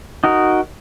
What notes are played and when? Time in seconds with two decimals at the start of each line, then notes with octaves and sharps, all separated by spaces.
0.24 D#4 F#4 A#4